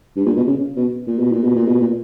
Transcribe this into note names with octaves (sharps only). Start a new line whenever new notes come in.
G2
A#2
B2
C#3
B2
A#2
B2
A#2
B2
A#2
B2
A#2